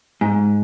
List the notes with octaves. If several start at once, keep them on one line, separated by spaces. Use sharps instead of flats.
G#2